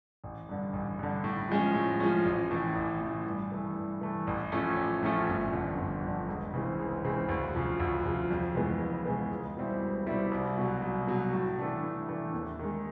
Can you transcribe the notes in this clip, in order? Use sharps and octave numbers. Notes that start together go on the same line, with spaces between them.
A1
G2 D3
A1
G2 D3
A2
F3 G#3 C#4
A2
F3 G#3 C#4
A1
A2 E3
A1
A2 E3
G2
E3 A3
G2
E3 A3
A1
A2 F3 A3 C#4
A1
A2 F3 A3 C#4
G1
F2 D3
G1
F2 D3
C#2
C#3 E3 G#3 C4
C#2
C#3 E3 G#3 C4
D2
C#3 F3
D2
C#3 F3
F2
C#3 E3 G#3 B3
F2
C#3 E3 G#3 B3
C#2
B2 G3 C4 E4
C#2
B2 G3 C4 E4
C2
B2 F#3
C2
B2 F#3
A2
E3 A3 D4
A2
E3 A3 D4
D#2
D#3 G#3